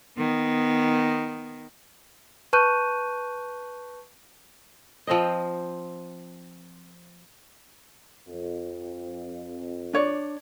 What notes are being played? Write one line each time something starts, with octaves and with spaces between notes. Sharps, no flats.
D#3 B3
B4 A5 C#6 F#6 G6 D#7
F3 C4 C5 D#5
F2
D4 C#5 D5